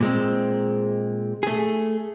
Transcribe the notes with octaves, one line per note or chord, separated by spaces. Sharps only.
A#2 G#3 C4
A3 G#4